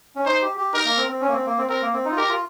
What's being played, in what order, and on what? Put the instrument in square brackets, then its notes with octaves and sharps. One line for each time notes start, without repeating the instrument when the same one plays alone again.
[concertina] C#4
[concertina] D#4 [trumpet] C5
[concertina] G4
G4
[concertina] D#4 [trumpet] A#4
[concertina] A#3
C4
C4
C#4
A#3
C4
A#3
C4
[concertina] C4 [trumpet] A#4
[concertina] A#3
C4
D#4
F4
[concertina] G4 [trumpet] A#4
[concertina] F4